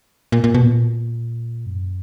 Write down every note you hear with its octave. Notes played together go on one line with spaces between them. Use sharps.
A#2
A#2
B2
A#2
F#2